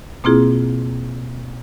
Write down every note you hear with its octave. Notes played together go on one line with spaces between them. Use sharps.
B2 A#3 C4 E4 F4 G#4